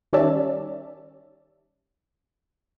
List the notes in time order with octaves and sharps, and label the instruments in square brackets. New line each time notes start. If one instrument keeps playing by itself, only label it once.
[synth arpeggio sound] D#3 G3 C#4 D5 E5 A5